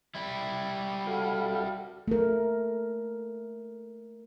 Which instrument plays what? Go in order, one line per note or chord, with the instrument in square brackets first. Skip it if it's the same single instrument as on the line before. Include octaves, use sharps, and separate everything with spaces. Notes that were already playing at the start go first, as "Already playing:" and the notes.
[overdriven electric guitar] G3 E4
[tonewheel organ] F#4 A4 F5
[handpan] A3 A#4